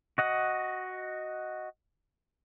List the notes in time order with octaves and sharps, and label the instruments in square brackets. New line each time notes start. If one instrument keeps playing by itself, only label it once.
[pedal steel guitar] F#4 D#5 F#5